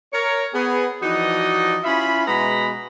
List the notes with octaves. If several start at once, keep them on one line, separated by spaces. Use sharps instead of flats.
A#4 C#5
B3 G#4
E3 F3 D#4 F#4 D5 D#5
C#4 E4 F4 E5 B5
B2 G#3 B3 A#5 B5